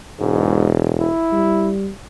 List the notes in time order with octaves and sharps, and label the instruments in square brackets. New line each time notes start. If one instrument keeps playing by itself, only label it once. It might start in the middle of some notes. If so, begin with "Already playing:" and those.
[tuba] E1 [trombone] G#2
[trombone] E4
[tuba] G3